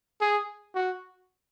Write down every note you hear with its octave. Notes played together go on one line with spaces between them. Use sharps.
G#4
F#4